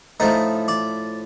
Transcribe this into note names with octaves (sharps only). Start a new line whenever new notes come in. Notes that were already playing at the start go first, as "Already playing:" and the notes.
A2 F3 A3 D#4
D5